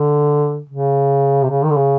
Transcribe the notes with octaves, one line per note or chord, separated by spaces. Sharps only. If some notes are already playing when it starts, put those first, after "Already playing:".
Already playing: D3
C#3
C3
C#3
D#3
D3
C#3